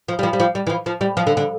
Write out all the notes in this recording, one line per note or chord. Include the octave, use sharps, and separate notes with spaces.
F3
G3
F3
G3
F3
G3
E3
F3
F3
G3
F3
D3
D3